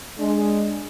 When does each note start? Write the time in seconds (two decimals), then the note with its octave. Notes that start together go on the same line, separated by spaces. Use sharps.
0.18 G#3 D4